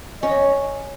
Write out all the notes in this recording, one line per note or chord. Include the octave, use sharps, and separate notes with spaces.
C#4 D#5